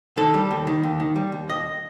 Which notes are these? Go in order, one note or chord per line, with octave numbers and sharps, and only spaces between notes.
D#3 A4
G3
D#2
D#3
D#2
D#3
G3
D#2
D#2 D#5